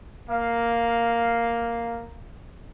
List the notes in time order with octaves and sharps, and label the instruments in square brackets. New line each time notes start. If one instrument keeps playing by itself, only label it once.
[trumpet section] A#3 F5